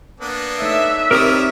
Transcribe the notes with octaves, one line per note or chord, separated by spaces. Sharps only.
A#3 B3 D4
A3 D#4 C#5 E5
G3 C4 D#4 G4 A#4 C#5 D5 D#6